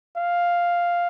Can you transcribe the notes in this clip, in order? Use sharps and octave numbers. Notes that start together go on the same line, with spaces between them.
F5